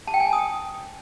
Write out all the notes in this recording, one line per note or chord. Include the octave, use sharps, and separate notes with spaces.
A5
G5
G#5
A5
D#6